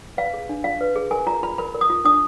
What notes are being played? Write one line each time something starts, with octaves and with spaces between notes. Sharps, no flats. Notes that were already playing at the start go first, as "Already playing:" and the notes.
B4 F5
G#4
D4
F4 F5
B4
G#4
A#4 G#5
F4 A#5
F4 B5
A#4 B5
A#4
D#6
F4
D4 D#6